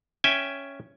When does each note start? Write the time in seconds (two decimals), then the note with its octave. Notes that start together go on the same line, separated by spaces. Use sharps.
0.24 C#4 E5 G5 G#5